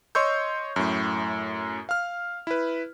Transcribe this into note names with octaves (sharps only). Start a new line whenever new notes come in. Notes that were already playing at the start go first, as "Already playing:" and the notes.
C#5 D#5 C6 C#6 E6 G6
F#2 A2
F5 F6
E4 B4